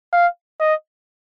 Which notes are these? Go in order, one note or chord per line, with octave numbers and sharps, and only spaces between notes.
F5
D#5